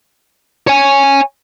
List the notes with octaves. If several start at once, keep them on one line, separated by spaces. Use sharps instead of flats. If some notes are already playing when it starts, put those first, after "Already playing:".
C#5 G#5